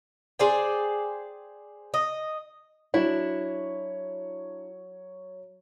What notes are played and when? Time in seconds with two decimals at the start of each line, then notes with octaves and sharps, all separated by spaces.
0.39 G#4 C5 D5 G5
1.94 D#5
2.94 F#3 D4 E4 C#5